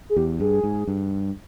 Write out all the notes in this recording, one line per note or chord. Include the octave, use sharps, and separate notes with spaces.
G#4
E2 G4
G2 G#4
G#2
G2